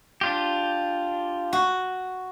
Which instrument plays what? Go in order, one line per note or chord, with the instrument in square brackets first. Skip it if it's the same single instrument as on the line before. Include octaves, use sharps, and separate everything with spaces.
[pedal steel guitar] D4 F4 G4
[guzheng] F#4